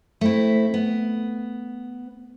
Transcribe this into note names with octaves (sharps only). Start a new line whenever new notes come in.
A3 C4 E4
B3